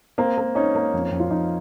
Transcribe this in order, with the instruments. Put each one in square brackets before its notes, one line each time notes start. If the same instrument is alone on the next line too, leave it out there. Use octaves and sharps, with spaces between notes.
[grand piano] A#3 [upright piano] C4
[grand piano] A#3
[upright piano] C#4 [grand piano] D#4
[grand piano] A#3
F2
F2
[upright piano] F4
[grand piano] F2 [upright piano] D#4